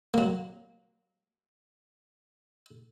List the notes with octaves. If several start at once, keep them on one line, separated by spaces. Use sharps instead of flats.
F#3 A#3